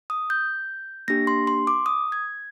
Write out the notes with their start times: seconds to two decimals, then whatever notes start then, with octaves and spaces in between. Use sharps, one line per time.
0.10 D#6
0.30 G6
1.08 A#3 D4 G4 A#6
1.27 C6
1.47 C6
1.67 D6
1.86 D#6
2.12 G#6